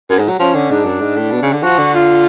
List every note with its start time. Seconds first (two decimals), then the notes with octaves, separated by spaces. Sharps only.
0.09 F#2
0.19 G#2
0.29 F#3
0.39 F3 C#4
0.55 D3
0.70 G#2 D4
0.85 F#2
1.01 G#2
1.16 A2
1.32 B2
1.42 C#3
1.53 D3
1.63 F3 F#4
1.78 D3
1.94 F4